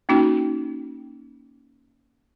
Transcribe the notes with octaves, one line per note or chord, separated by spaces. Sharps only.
A#3 C#4 D#4 F#4 G5